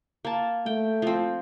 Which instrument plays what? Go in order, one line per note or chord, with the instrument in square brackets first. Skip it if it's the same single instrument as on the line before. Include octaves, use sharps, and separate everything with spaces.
[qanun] A#3 A5
[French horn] A3 [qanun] G5
[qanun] F3 C4